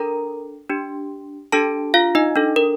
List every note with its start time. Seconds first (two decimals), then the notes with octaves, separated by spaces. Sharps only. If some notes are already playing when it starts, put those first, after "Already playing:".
Already playing: D4 A4 A#4 A#5
0.70 D4 G4
1.52 D4 G4 A4 A5
1.94 F4 F5
2.15 D#4 D#5
2.36 D4 A4
2.56 A#4